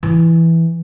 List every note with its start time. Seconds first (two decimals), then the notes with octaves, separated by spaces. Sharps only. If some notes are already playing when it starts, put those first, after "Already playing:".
0.03 E3